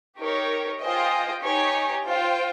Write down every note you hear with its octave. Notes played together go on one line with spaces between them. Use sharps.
D#4 G4 A#4 C#5
F4 G#4 C5 D#5 G5
D#4 G4 C#5 G#5
F4 C5 G5